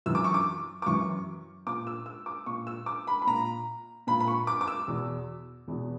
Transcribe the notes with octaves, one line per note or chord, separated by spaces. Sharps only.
F#2 E3 E6
D6
C#6
D6
D6
F#2 E3 C#6
A#2 D6
E6
E6
D6
A#2 C#6
E6
D6
B5
B5
A#2 A#5
A#2 B5
B5
C#6
D6
D6
E6
E2 B2
E2 B2